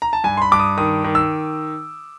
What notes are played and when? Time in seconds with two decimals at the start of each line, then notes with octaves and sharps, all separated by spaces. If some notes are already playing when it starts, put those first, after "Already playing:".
0.02 A#5
0.13 A5
0.24 G2 G#5
0.37 C6
0.42 B5
0.51 G2 D6
0.60 D#6
0.77 D#3 D#6
1.04 D#3
1.15 E6